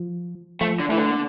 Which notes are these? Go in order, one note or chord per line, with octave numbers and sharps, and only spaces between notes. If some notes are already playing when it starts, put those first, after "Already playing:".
Already playing: F3
F3 A3
D3
E3 A3
D3
A#3